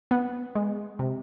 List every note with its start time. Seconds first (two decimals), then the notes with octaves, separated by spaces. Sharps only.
0.11 B3
0.55 G#3
0.99 C3